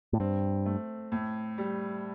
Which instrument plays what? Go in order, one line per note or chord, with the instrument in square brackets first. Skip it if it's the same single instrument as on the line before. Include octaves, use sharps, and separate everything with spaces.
[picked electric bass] A2
[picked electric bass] G2 [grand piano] C4
[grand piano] A3
A2
G3